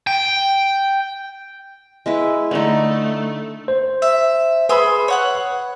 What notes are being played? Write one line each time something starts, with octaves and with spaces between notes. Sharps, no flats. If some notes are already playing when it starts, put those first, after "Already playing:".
G5
G#3 E4 B4
D3 A3 D#4
C5
E5
G#4 B4 B5 C6 E6
C#5 F#5 F#6